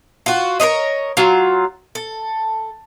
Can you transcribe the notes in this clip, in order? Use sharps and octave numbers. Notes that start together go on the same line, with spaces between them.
F4 F#4
A#4 C5 C#5 D#5
F#3 F4
A4